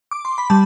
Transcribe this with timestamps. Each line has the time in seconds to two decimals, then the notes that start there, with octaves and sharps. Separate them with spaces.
0.11 D6
0.25 C6
0.38 B5
0.50 G3 A5